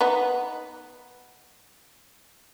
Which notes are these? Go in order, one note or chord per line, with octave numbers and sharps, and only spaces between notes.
B3 D#4